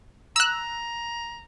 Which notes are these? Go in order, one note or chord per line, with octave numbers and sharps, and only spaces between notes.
A#5 E6 F#6